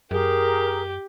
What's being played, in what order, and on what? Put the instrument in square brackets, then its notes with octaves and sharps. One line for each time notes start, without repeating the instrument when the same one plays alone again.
[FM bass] F#2 [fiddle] G4 [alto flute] G#4 [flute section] A#4